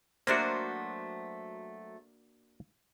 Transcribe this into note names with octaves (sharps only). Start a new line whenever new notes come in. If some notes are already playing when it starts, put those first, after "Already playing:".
F#3 A3 A#3 D4 F#4 C5